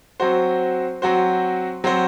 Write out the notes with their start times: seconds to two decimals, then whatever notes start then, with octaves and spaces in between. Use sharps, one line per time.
0.20 F#3 C4 F#4 C5
1.02 F#3 C4 F#4 C5
1.84 F#3 C4 F#4 C5